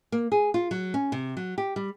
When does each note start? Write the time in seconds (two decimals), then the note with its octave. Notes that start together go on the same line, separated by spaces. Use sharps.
0.12 A#3
0.32 G#4
0.54 F4
0.71 F#3
0.94 C#4
1.12 C3
1.37 F#3
1.58 G4
1.76 G3